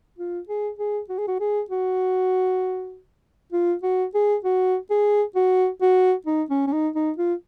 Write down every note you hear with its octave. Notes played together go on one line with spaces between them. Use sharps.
F4
G#4
G#4
F#4
G#4
F#4
G#4
F#4
F4
F#4
G#4
F#4
G#4
F#4
F#4
D#4
C#4
C#4
D#4
D#4
F4